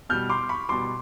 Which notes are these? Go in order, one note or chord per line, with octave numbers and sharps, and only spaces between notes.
B2 G3 F6 G6
C6 D6
B5 C#6
B2 G3 C6 D6